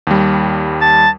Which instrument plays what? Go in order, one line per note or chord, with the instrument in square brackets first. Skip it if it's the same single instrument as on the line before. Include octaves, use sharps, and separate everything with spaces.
[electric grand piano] D#2 G3
[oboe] A5